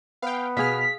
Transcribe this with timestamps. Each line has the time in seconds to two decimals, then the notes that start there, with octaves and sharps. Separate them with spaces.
0.22 B3 F5 G5
0.57 B2 G#4 F5 F6 B6